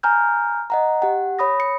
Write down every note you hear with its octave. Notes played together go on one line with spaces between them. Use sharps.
G#5 A#5 F6 G6
D#5 F#5 A#5
G4 F#5
C#5 B5 D#6 A#6
C#7